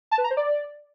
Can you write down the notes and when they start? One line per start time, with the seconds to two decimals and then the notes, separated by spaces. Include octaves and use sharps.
0.11 A5
0.18 B4
0.24 A#5
0.31 C5
0.37 D5